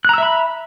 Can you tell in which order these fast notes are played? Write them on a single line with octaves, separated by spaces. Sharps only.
F#6 A#5 E6 E5 B5